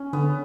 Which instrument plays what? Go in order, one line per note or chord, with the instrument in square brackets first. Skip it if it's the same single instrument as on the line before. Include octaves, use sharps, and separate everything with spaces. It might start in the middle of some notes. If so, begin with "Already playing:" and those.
Already playing: [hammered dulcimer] C#4
[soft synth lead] D3 [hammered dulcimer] B3